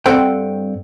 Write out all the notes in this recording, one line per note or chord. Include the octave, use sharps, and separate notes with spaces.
G2 C4 A4 C5 F#5 G5